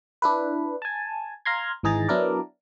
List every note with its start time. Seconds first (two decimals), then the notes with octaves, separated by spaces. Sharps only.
0.22 D4 E4 B4
0.82 G#5 A5
1.45 F5 A#5 C6 G#6
1.83 G#1 E3 D#4 G#4 A#5 A6
2.08 F#3 B3 D4 E4 A#4 D5